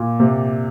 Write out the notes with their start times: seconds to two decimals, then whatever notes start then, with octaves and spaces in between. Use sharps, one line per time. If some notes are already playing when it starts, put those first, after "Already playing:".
Already playing: A#2
0.20 C3